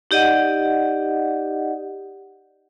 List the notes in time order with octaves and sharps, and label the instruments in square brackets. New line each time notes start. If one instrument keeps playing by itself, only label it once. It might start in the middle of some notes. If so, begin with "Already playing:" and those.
[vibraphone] D#4 G4 D5 D#5 F#5